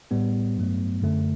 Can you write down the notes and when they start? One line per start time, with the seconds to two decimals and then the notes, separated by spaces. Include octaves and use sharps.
0.11 A2 G3 B3
0.57 G2 F#3 A3
1.02 F#2 D3 A3